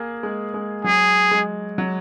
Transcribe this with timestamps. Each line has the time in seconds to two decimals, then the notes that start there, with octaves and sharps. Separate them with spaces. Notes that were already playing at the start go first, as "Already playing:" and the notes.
Already playing: A#3 G#4
0.23 G#3
0.54 G#3
0.84 F#3 G#4
1.31 G#3
1.78 F#3